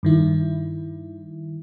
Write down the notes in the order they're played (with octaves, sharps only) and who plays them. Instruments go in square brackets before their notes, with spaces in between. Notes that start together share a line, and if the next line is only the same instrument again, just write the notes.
[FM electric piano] G2 D#3 E4